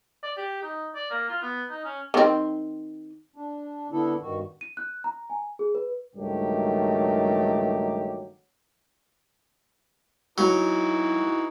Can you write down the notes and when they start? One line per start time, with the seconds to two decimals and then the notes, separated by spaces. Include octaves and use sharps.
0.23 D5
0.38 G4
0.62 D#4
0.95 D5
1.11 A#3
1.29 F4
1.42 B3
1.70 D#4
1.85 C#4
2.14 D#3 C4
3.36 D4
3.92 D3 B3 D4 E4 A4
4.21 G2 D#3 F#4
4.61 D#7
4.77 F#6
5.04 A#5
5.30 G#5
5.59 G#4
5.75 B4
6.15 C#2 G2 D#3 F#3 A3 G4
10.38 E3 F#3 D#4 F#4